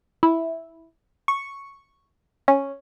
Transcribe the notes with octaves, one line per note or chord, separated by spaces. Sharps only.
E4
C#6
C#4